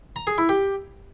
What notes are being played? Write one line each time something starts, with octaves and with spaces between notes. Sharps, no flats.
A#5
G#4
E4
G4